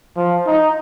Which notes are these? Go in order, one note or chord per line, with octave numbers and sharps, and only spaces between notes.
F3
D#4